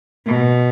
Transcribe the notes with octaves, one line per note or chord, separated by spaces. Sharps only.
B2